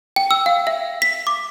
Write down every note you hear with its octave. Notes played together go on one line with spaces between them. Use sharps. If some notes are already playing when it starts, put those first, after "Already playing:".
G5
E6
F5
E5
B6
D6